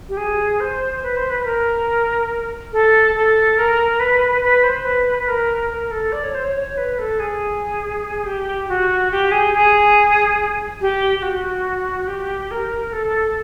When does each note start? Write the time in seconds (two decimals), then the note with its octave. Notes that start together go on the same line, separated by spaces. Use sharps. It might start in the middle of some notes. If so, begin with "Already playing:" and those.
0.09 G4
0.17 G#4
0.60 C5
1.03 B4
1.16 C5
1.30 B4
1.40 B4
1.45 A#4
2.73 A4
3.15 A4
3.58 A#4
4.00 B4
4.43 B4
4.63 C5
4.85 B4
5.18 B4
5.28 A#4
5.70 A#4
5.91 A4
6.12 D5
6.23 C#5
6.34 C5
6.44 C#5
6.56 C#5
6.77 B4
6.98 A4
7.20 G#4
8.26 G4
8.68 F#4
9.11 G4
9.31 G#4
9.54 G#4
10.81 G4
11.19 G4
11.22 F#4
12.07 G4
12.51 A#4
12.92 A4